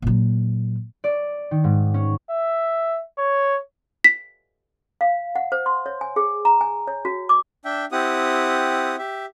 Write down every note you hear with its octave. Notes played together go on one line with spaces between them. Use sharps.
A#2 F#3
D5
D#3
G#2
C#4
E5
C#5
B6
F5
F#5
C5
C6
C#5
G#5
G#4
A#5
G#5
C#5
F#4
D6
D4 E5 G5
C4 E4 G4 F#5 D#6
G4 E5